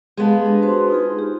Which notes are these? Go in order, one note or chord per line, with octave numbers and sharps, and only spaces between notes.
G#3 B3 G4 F5 A5
D4
F#4 C5 C6
D#4 F4 G#4
G4